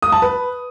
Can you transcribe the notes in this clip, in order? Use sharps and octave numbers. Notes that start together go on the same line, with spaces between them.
D#6
A5
B4